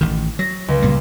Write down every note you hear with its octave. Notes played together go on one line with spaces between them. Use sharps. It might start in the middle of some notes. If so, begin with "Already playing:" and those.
A1 D#3
F#3 A#6
C#2
A#2 G3